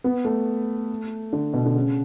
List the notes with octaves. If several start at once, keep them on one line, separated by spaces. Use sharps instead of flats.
B3
A3
D3
B2
D3
C#3